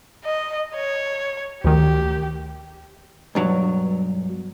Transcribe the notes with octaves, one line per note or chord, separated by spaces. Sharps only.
D#5
C#5
D2 D#3 G4
B1 G2 F#3